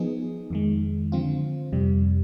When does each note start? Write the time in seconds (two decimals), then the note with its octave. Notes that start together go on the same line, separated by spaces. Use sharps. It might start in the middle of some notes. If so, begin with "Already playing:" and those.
Already playing: F3 B3 D#4 G#4
0.50 F2 D#3 G#3
1.12 D3 F3 C4 F4
1.72 F2 C3 G3